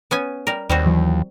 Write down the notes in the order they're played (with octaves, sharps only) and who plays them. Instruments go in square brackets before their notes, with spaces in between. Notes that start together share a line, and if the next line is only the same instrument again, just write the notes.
[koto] B3 C#4 G#5
G3 A#4
[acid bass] D#2 [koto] G3 C4 F#4
[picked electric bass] E3 F#3